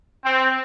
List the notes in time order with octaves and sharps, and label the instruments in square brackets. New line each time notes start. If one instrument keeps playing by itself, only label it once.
[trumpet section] C4